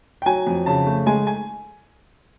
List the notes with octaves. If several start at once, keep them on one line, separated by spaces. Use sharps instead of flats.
G5
F#3 G#5
F2
C#3 A5
A3
G#3 G#5
G#5